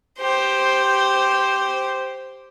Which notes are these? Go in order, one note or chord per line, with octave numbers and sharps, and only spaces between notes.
G4 C5